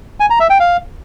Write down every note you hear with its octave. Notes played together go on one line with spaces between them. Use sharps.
G#5
A#5
E5
G5
F5